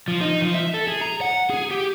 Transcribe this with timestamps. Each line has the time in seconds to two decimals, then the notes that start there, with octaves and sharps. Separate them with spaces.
0.08 F3
0.21 D#4
0.41 F3
0.54 E5
0.74 A4
0.88 G#4
1.01 A#5
1.21 F#5
1.50 G#4
1.71 G4